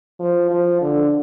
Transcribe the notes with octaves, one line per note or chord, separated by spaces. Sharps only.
F3
F3
D3